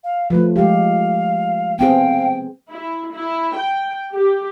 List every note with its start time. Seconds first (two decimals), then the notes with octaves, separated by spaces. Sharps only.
0.04 F5
0.30 F3 A3 B4
0.56 G#3 G4 F5
1.79 B3 C4 G#4 F5 G5
2.69 E4
3.13 E4
3.55 G5
4.13 G4